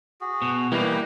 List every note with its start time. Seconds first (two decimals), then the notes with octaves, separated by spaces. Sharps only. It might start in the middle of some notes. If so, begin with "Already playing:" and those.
0.21 F#4 G#4
0.42 B2
0.72 E3 G3 A#3 D#4 G4 B4